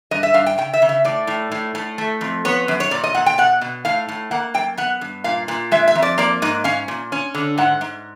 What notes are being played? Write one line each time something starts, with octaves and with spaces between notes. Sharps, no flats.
G2 D#5
E5
G2 F5
G5
C#3 G5
E5
C#3
E5
A2 D5
A2
A2
A2
A3
F2
B3 C#5
F#2
C#5
A#2 D5
D#5
A#2 F#5
G5
B2 F#5
B2
A2 F5
A2
A#3 F#5
F#2 G5
B3 F#5
G2
A#2 F5
A#2
G#3 E5
E5
F2
D5
A#3 D5
G#2 D#5
C#4 F5
A#2
C#4
D3
G#2 F#5
G#2